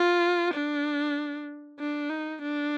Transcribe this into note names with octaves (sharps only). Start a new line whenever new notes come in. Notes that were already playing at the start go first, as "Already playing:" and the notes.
Already playing: F4
D4
D4
D#4
D4